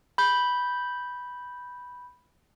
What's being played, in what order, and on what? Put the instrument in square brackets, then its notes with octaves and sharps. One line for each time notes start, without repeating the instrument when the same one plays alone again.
[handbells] B5 G6